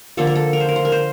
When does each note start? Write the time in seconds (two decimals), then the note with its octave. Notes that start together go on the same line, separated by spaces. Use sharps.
0.17 D3 F3 A#3 A4
0.27 A#4
0.35 A4
0.53 A#4
0.60 C5
0.69 A#4
0.76 C5
0.85 A#4
0.92 C5